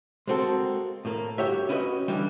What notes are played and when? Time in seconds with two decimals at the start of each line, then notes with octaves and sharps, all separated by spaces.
0.28 G#3 A#3 C4 F#4 A4
1.05 A2 A#3
1.38 G2 F#4 G4 C#5 E5
1.69 C#4 E4 F#4 G#4 B4 D#5
2.08 D3 E3 G3